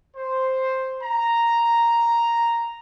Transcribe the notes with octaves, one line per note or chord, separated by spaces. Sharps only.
C5
A#5